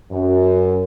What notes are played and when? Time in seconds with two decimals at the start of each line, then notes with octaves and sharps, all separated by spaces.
0.12 F#2